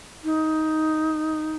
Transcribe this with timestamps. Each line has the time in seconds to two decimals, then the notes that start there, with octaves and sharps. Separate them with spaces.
0.24 D#4